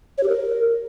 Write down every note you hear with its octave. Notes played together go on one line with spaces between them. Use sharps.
C#5
G4
A#4